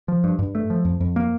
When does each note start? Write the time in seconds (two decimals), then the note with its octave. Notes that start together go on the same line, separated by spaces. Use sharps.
0.08 F3
0.24 G2
0.39 G2
0.55 A3
0.70 F3
0.85 F2
1.00 F2
1.16 A#3